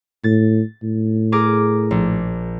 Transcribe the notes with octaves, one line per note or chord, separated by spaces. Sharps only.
A2 A6
A2
G#4 A#4 D6
A#1